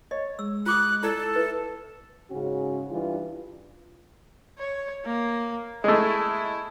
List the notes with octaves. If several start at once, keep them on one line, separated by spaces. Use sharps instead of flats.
C#5 D#5
G#3 E6
F4 D6 D#6 F#6
E4 A4 D5
E4 B4
G#2 C#3 C#4 F#4
G2 E3 F4
C#5
A#3
G#3 A3 E4